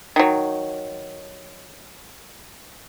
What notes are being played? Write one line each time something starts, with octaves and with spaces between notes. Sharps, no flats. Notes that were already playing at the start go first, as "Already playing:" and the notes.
D#3 F#3